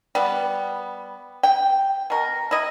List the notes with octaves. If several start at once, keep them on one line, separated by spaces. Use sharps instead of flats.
G3 B3
G5
B2 A#4
E4 D#5